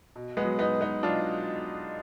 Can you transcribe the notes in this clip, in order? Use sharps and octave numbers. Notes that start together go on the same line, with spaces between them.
B2
G#3 B3
F#3
B3 D#4
B2
B3 D#4
F#3 D4 F4